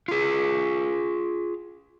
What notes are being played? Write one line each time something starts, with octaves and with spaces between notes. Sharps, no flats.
F4 G#4